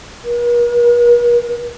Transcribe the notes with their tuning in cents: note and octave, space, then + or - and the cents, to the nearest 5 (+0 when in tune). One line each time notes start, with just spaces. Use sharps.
A#4 +45